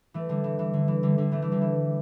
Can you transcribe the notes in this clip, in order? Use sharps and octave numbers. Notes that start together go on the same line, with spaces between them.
E3 A3
D3 G3
E3
E3
D3
E3
D3 G3
D3 G3
E3 A3
E3
D3 G3
E3